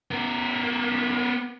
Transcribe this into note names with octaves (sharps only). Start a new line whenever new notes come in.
B3 A#4